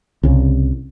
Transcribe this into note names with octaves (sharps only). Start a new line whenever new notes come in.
C2 C#3